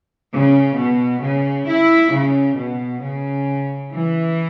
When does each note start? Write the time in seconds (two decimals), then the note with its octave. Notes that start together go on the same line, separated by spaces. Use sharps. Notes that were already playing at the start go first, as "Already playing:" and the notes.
0.33 C#3
0.77 B2
1.23 C#3
1.68 E4
2.13 C#3
2.57 B2
3.02 C#3
3.91 E3